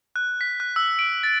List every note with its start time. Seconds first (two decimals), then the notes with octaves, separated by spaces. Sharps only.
0.16 F#6
0.41 B6
0.60 F#6
0.76 E6
0.99 D7
1.23 A6